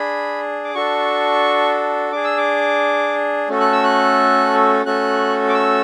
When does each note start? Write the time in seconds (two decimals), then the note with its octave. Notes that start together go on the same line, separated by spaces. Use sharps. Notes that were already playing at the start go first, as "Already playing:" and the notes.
Already playing: D4 G#4 B5
0.64 D6
0.75 D4 F#4 A4 C#6
2.12 D4 G#4 D6
2.24 E6
2.37 D6
3.48 A3 C#4 F#4 A4
3.60 F#6
3.72 E6
3.83 F#6
4.86 A3 C#4 F#4 A4 F#6
5.49 D6
5.54 E6